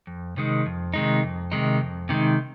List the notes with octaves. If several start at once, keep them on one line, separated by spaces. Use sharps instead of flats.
F2
C3 D#3 G#3 D#4
F2
C3 D#3 G#3 D#4
F2
C3 D#3 G#3 D#4
F2
C3 D#3 G#3 D#4